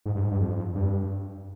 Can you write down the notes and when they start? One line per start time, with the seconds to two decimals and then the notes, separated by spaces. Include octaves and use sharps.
0.06 G#2
0.15 G2
0.22 G#2
0.31 G2
0.41 F2
0.75 G2